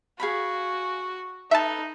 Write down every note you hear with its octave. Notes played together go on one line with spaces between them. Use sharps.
F#4 G#4 F5 B5
D#4 A4 B4 E5 A5